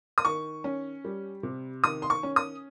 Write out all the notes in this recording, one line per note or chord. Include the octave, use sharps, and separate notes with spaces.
D#6
D#3 C#6
C#4
G3
C3
D#3 D#6
C6
C#6
C#4
D#6